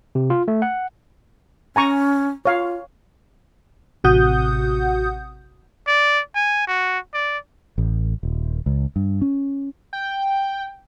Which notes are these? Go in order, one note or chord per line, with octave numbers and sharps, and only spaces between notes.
C3
F4
A3
F#5
C#4 G#5 A#5 C#6
F4 C#5 F5
A1 C3 F#4 F#5 D#6 G6
D5
G#5
F#4
D5
A1
D#1
C#2
G2
C#4
G5